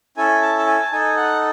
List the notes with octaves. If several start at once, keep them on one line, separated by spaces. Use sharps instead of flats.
C#4 E4 A4 G#5
A5
A5
G#5
A5
D#4 A4 G#5
F#5